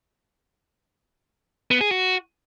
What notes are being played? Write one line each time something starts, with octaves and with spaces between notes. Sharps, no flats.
B3
G#4
F#4